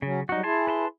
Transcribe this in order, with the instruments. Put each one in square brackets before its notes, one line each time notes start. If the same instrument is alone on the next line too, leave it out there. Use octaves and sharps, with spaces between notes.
[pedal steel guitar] C#3 [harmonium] F#3 C#4
[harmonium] F#3 G3 [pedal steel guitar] D#4 F#4
[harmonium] E4 G#4 [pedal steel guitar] G#5 A5 C6
[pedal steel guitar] B4 A5 C6